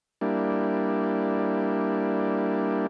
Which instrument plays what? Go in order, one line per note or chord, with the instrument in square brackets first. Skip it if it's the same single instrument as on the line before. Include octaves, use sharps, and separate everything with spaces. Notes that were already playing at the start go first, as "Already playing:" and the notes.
[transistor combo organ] G3 A#3 D4 E4